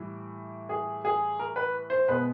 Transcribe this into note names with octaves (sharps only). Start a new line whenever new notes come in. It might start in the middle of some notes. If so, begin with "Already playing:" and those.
Already playing: A2 E3 G3
G#4
G#4
A#4
B4
C5
B2 G#3 B4